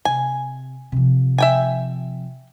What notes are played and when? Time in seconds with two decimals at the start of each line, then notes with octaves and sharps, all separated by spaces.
0.05 C3 G#5
0.92 C3 F3
1.38 E5 G5 G#5